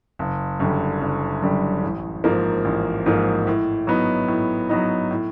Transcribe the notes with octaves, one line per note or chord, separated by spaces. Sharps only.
F#1
F#2 D3 G3
F#1
F#2 D3 G3
A1
G#2 F3 A#3
A1
G#2 F3 A#3
A2
F#3 B3 D#4
A2
F#3 B3 D#4
A2